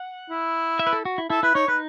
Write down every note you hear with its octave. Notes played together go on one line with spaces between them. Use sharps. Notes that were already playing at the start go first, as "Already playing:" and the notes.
Already playing: F#5
E4
E5
B4
A4
F#4
E4
E4 A4
E4 B4
D#4 C#5
D#4 B4